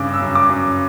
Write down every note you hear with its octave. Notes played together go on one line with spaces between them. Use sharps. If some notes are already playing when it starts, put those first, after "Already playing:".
Already playing: G2 C#3 D6
E6
F#2
D6
F#2